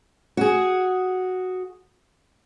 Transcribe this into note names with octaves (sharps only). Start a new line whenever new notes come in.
F#4 G#4